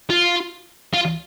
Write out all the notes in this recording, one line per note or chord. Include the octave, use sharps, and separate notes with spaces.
F4
F4